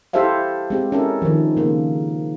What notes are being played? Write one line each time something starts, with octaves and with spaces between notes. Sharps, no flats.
E4 G4 A4 C5 E5 F5
G#3 C4 G4
C#4 E4 A4 A#4
D#3 F3
C#3 A#3